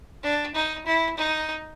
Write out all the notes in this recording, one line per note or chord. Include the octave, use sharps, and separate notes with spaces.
D4
D#4
E4
D#4